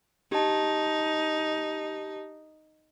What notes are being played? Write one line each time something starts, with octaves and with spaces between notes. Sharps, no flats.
D#4 G4 A5